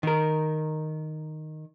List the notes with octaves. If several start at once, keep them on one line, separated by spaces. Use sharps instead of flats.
D#3 A#4